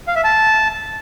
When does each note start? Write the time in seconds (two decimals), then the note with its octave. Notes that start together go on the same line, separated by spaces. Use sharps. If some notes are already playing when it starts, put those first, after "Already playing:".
0.08 F5
0.16 E5
0.24 A5